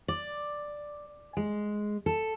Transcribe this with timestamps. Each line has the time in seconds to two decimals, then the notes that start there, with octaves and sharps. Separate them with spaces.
0.08 D5
1.37 G#3
2.06 A4